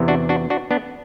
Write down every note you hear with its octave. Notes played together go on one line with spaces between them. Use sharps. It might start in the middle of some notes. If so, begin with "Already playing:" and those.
Already playing: E2 C3 E3
D4 F#4
D4 F#4
D4 F#4
B3 D4